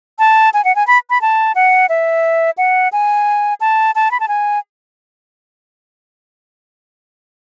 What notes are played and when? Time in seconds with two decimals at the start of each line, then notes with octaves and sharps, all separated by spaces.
0.19 A5
0.54 G#5
0.65 F#5
0.76 G#5
0.87 B5
1.10 B5
1.21 A5
1.55 F#5
1.89 E5
2.58 F#5
2.92 G#5
3.61 A5
3.95 A5
4.11 B5
4.20 A5
4.28 G#5